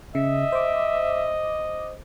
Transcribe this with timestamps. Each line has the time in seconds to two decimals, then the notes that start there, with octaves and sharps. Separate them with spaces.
0.15 C#3 D#5 E5
0.52 C5 D6